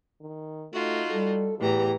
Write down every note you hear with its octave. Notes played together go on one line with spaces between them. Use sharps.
D#3
A3 D#4 F4 F#4
G3 A4
E2 A2 E3 G4 A#5